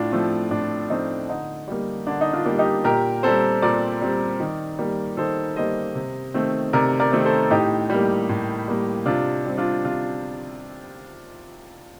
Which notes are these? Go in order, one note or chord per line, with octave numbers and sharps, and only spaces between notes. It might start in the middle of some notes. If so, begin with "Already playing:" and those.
Already playing: A2 D4 F4
F3 A3 C4
A2 D4
F3 A3 C4 D#4
D3 D#4
G3 A#3
D3 D4
D#4
D4 F4
G3 A#3
D#4 G4
A#2 G4 A#4
G3 C4 A4 C5
A#2 A#4 D5
G3 C4
D#3
G3 A#3
D#3 A4 C5
G3 A#3 C5 D#5
C3
D#3 A3 C4
C3 A#4 D5
A#4 D5
D#3 A3 C4
A4 C5
A2 D#4 G4
G3 A#3
A2
G3 A#3
C3 D4 F4
G3 C4
D4 F4
C3 D4 F4